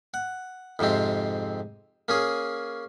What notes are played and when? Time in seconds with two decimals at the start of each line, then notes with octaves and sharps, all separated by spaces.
0.14 F#5
0.79 F2 G#2 C3 C4
2.08 A#3 C#4 G#4